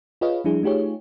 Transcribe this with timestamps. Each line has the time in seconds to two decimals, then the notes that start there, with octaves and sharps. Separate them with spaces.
0.21 F4 G#4 B4 C#5 D#5 F5
0.44 F3 G3 D4 E4 G#4
0.63 A3 D#4 F4 G4 G#4 C#5